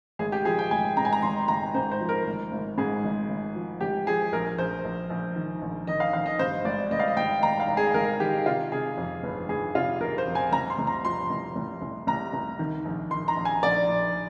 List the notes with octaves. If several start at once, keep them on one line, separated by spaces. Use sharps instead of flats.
G#1 G#4
G4
F3 G#4
G5
G#1 G#5
G#2 A#5
G#5
A#5
G#1 C6
G#1 A#5
G#2 C5
C5
F3
A#4
G#1
G#1
G#2 G#4
G#1
G#1
F3
G#1 G4
F3 G#4
A#1 A#4
A#1 C5
A#1
A#1
D#3
A#1
D#3 D#5
F5
D#3 F5
D#5
G2 C5
G#1 D5
G#1 D#5
F5
D#5
G#1 G5
G#1 A#5
F5
G#1
G#4
G#1 A#4
D#3 G4
C3 F4
C3 G#4
F2
G1
G1 G#4
C3 F4
G1 A#4
C5
F2
G#5
C2 A#5
C6
C2
A#5
F3 C6
C2
C2
C2
C2 A#5
C2
D#3
A#1
D#3 C6
A#5
A#1
G#5
A#1 D5
A#1